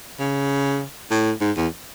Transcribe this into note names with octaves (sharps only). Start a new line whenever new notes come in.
C#3
A2
G#2
E2